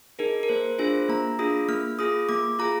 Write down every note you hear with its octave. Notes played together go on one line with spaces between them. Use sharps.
D#4 G#4 A#4
A#4
A#3 C5
D4 F4 G#4 C5
A#3 A#5
D4 F4 G#4 D#6
A#3 F6
F4 G#4 D#6
A#3 D6
F4 G#4 A#5